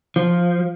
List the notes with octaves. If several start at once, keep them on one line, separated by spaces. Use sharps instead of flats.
F3